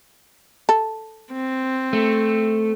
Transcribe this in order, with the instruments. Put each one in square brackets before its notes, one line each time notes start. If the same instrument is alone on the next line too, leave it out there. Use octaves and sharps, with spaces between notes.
[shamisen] A4
[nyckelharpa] C4
[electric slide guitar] A3